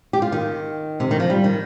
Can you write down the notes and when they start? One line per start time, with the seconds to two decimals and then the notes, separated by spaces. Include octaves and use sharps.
0.13 G4
0.22 F4
0.32 D#3
1.00 C3
1.11 D#3
1.20 F3
1.30 G3
1.44 D#3